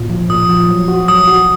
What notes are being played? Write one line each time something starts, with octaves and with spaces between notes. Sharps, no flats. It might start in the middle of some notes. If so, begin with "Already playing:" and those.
Already playing: A#2
F3
A#2 D#6
F3
F#3
F#4
F#3 D#6
F#4